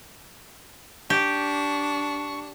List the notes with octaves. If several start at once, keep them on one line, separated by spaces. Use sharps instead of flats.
D4 G4 C#6